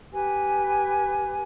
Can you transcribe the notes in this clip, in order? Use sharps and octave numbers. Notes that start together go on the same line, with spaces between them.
G4 B4 G#5